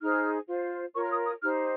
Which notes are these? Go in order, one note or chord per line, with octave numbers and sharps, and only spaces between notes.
D#4 G#4 C5 F6
F4 C5
F4 A#4 C#5 C#6
F6
D#6
D#6
D#4 G4 C5 F6